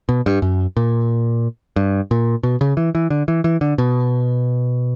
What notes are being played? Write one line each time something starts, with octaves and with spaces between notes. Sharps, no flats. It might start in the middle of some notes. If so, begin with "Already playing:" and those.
B2
G2
F#2
A#2
G2
A#2
B2
C#3
E3
E3
D3
E3
E3
D3
B2